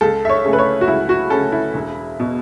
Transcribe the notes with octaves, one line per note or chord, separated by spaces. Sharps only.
C#2 A4
E5
C#5
C#3 A3 C#4
B4
C#5
F#4
C#2 E4
F#4
C#3 A3 C#4 A4
E4
E1
B2